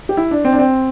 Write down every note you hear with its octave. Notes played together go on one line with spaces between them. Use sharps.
G4
E4
D4
C4
D4
C4